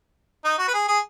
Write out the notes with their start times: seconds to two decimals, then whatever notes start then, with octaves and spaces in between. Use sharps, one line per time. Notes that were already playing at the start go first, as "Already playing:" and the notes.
0.45 D#4
0.59 F#4
0.68 B4
0.74 G#4
0.88 G#4